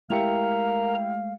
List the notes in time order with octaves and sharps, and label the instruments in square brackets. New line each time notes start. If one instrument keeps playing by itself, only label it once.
[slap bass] G#3 A3 [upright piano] E4 G4 C#7 [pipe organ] A#4 A#5 [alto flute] F5